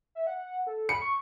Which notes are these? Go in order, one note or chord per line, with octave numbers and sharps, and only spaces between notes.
E5
F#5
A4
B5 C#7
C#6